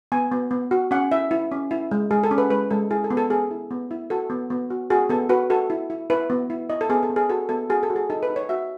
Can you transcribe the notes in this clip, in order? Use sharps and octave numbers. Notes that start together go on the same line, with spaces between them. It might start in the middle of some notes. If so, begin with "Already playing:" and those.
B3 G#5
B3
B3
F#4
C#4 F#5
E4 E5
E4
C#4
E4
G#3
G#3 G#4
A4
C#4
B4
G#3 B4
G#3 A4
E4 G#4
A4
B3
A4
B3 G#4
E4
B3
E4
F#4 A4
B3
B3
F#4
F#4 G#4
B3 A4
F#4 B4
F#4 A4
E4
E4
E4 B4
B3
E4
E4 D#5
A4
B3 G#4
A4
B3
G#4
F#4 A4
B3 A4
F#4 G#4
A4
F#4
G#4
D#4 A4
B4
D#4
C#5
F#4 E5